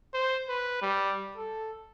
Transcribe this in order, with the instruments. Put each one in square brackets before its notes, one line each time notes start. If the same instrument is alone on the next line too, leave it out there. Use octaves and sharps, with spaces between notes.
[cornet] C5
B4
G3
A4